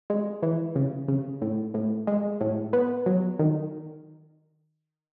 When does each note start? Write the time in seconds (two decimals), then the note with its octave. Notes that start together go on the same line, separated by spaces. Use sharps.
0.10 G#3
0.42 E3
0.75 C#3
1.08 C#3
1.42 A2
1.74 A2
2.07 G#3
2.41 A2
2.73 B3
3.06 F#3
3.39 D#3